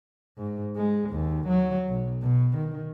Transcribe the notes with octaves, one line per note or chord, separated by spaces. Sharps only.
G#2
G#3
D#2
F#3
B1
B2
D#3